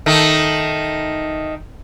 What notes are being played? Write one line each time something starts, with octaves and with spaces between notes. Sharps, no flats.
D#3 A3